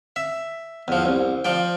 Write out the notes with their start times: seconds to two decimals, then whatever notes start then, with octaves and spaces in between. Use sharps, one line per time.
0.16 E5
0.88 E2 F3
1.05 C2
1.45 F3 D5 G5